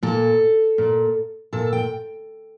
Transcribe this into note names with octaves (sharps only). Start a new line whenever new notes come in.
A#2 A4
A#2
A#2 A4
G5